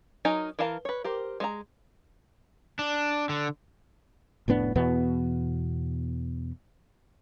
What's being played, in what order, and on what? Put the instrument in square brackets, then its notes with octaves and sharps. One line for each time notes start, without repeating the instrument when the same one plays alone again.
[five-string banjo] F#3 D#4 A#4 G#5 A#5
E3 A#4 F5 A5 A#5
B4 C#5
G4 A#4 C5
G#3 C5 A#5
[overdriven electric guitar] D4
D3
[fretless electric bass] F1 A2 B3 D4
E2 B2 B3